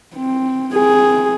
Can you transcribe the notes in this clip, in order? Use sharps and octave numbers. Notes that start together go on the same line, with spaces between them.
C4
C4 G#4